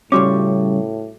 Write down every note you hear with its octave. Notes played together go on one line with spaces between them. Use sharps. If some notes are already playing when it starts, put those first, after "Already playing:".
A2 C#3 G3 C#4 F#4 D6